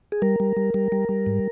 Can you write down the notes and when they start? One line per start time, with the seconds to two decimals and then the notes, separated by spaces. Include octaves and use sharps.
0.12 G#4
0.22 G3 A#4
0.40 G3
0.57 G3
0.74 G3
0.92 G3
1.09 G3
1.26 G#2